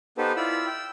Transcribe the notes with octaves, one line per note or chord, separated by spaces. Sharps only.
B3 D#4 G4 A4 B4 C5
E4 F4 D5 B5 E6
G5 E6